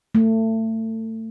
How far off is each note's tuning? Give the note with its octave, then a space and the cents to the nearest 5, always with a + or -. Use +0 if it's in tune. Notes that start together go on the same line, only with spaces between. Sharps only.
A3 +25